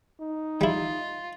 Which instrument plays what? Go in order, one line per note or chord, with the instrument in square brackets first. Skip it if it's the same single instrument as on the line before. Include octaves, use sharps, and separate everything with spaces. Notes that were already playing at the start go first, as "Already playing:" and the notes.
[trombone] D#4
[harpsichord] G3 E4 [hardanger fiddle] F4